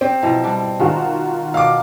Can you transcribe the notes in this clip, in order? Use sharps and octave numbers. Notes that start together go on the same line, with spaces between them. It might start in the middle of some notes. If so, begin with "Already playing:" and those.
C4 G4
B2 F3 F#3 E4
G3 D4
D#3 G#3 F4 F#4
B2 F5 D6